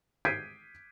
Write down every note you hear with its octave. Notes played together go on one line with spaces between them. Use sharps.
G6 G#6 B6 C7 D7 D#7